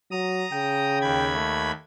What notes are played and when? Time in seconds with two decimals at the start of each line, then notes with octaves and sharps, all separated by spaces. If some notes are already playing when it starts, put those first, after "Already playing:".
0.11 F#3 A#5 D#6
0.52 C#3 G5
1.01 D#2 B5 G#6
1.35 A3